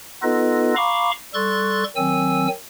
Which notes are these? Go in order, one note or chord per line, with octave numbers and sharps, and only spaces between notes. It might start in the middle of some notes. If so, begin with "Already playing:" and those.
B3 D#4 F4 A4 B4 D#5
F5 A#5 B5 C#6 D6
G3 A4 C6 C#6 F#6 A6
D#3 F#3 C4 G#5 E6